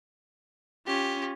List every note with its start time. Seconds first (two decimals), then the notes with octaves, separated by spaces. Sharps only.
0.87 C#4 F4 G4